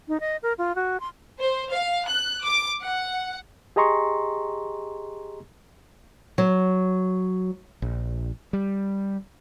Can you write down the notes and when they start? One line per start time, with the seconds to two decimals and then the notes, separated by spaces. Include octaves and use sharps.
0.08 D#4
0.20 D#5
0.43 A#4
0.58 F4
0.75 F#4
1.00 C6
1.39 C5
1.72 F5
2.07 F#6
2.44 D6
2.82 F#5
3.76 G4 G#4 D#5 A#5 C6 C#6
6.38 F#3
7.82 A#1
8.53 G3